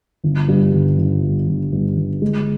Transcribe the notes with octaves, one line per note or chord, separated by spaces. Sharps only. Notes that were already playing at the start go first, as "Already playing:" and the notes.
G1
G2
G1
G1
G2
G1
G2
G1
G#3